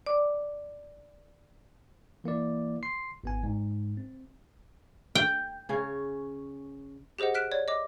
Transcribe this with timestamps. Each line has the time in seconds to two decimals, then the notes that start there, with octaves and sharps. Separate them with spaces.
0.06 D5 D6
2.24 E3 A#3 E4 D5
2.83 C6 C7
3.24 G#1 B3 G#5
3.43 G#2
3.97 C4
5.15 G5
5.69 C#3 C#4
7.19 G4 G#4 C5 D#5 F#5
7.34 F6 F#6 B6 D7 E7
7.52 C#5 D5 G#6
7.68 D#5 D6